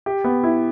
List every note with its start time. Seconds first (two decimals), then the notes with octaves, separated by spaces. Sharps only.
0.06 G4
0.24 B3
0.44 E4